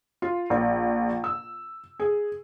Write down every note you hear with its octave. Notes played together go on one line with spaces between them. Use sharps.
F4
A#1
E6
G#4